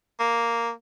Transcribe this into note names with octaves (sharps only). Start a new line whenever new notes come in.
A#3